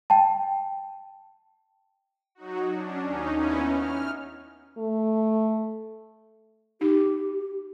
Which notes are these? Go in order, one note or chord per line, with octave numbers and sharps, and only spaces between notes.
G5 A5
F#3 D#4 F#4
C#4 D4
D#2 C#4 D#4
B3 C#4 D#4 E4
F6
A3
D#4 G4